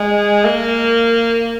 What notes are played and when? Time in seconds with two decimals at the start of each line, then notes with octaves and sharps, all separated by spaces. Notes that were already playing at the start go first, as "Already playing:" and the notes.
Already playing: G#3
0.45 A#3